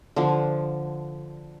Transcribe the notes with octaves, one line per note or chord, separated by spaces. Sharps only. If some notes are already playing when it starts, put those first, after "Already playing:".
D3 F3